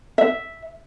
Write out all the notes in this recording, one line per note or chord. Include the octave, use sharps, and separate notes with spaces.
E5